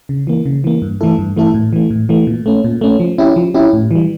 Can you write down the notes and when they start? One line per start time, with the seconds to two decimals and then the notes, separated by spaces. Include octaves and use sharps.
0.09 C#3
0.27 E3 A#3
0.46 C#3
0.64 E3 A#3
0.82 G2
1.01 E3 A3 E4 A4
1.19 G2
1.36 E3 A3 E4 A4
1.54 A2
1.73 E3 A3
1.90 A2
2.09 E3 A3
2.27 A#2
2.46 A3 C#4
2.64 A#2
2.81 A3 C#4
3.00 F3
3.18 C#4 E4 G4
3.36 F3
3.54 C#4 E4 G4
3.73 A2
3.91 E3 G3